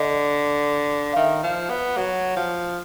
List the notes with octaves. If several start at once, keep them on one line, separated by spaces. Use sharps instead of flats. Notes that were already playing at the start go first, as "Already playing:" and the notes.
Already playing: D3 D#5
F5
D#3 E5
F3
B3
F#3
F3